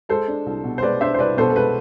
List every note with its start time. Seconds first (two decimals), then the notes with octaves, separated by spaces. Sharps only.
0.09 G#3 A4 C5
0.28 D4
0.46 C2
0.64 B2
0.78 C5
0.82 G#3 B4 D5
1.01 D4 C5 E5
1.14 C5
1.19 C2 B4 D5
1.37 B2 A4 C5
1.50 A4
1.56 G#3 B4